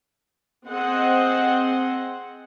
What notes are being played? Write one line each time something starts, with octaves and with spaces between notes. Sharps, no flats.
C4 G#4 C5 D#5 F#5